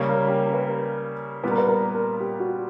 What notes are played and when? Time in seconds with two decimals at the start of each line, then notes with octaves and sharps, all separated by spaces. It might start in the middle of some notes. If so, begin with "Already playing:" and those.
Already playing: C#3 G3 A#3 C#4
0.08 A#4
0.28 G4
0.46 A#4
0.54 B4
0.61 A#4
1.43 A#2 G3 B3 B4
1.51 A#4
1.58 B4
1.69 A#4
1.95 A#4
2.20 G4
2.40 F#4